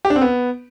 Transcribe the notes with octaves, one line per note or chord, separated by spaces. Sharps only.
G4
D4
C4
B3